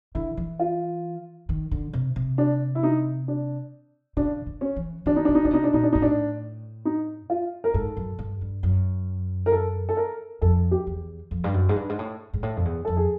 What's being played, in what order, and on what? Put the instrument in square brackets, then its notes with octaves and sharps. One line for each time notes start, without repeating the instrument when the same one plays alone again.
[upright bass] D3 [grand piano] E4
[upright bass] E3
[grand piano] F4
[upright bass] D#3
D3
C3
C3
[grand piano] D4
E4
D#4
D4
[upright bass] C#3 [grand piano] D4
[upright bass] D3
[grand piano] C#4
[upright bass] E3
[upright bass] D#3 [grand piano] D4
[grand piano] D#4
[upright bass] C#3 [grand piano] D4
[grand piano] D#4
[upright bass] C#3 [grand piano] D4
[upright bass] C3 [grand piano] D#4
[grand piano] D4
[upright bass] A#2 [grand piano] D#4
[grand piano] D4
[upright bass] A2 [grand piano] D#4
[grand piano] D4
D#4
F4
A#4
[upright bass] G#2 [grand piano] A4
[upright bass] F#2
G2
G2
F#2
[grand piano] A#4
A4
A4
A#4
[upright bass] F2 [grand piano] A4
[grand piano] G4
[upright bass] E2
F2
G2
F#2
G#2
G2
G#2
A2
G#2
A2
F2
E2
[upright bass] F2 [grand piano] A4
[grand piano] G#4